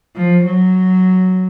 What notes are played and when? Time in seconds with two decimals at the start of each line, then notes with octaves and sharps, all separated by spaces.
0.16 F3
0.45 F#3